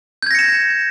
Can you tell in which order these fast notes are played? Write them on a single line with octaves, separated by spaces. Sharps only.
G6 G#6 A#6 C#7 E7